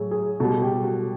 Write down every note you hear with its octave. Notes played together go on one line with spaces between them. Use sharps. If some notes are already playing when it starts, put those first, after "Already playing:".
Already playing: A2 F#3 G#4
G#4
B2 G3 A4
G4
F#4